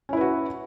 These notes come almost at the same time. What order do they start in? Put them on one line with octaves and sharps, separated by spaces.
C#4 E4 B4 F#4